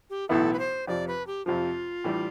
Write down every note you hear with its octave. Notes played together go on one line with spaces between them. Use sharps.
G4
B1 A2 E3 B3 E4 A4
B4
C5
F2 C3 F3 D5
B4
G4
F2 C3 F3 F4
A2 E3 G3 D4